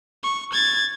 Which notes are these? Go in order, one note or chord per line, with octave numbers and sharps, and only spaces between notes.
C#6
G#6 A6